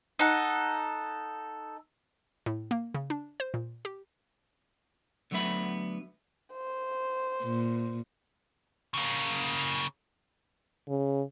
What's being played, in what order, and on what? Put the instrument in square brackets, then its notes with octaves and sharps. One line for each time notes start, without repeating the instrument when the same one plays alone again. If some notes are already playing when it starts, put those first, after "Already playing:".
[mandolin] D#4 A4 F#5
[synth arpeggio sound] A2
A#3
C#3
D4
C5
A#2
G4
[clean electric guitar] D3 F#3 A3 B3 E5 B5
[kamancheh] C5
[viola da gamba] A#2
[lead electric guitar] C#3 A#3
[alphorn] C#3